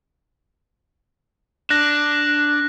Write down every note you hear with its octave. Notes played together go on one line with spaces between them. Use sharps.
D4 F#6 A#6